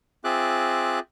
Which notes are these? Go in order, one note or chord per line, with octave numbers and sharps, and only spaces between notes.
C4 F4 G#4 E5 D6 F#6